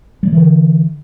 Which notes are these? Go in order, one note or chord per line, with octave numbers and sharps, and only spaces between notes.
D3 E3 F3 G3